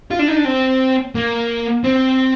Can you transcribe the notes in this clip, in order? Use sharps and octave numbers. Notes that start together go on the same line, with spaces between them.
F4
D4
D#4
D4
C4
A#3
C4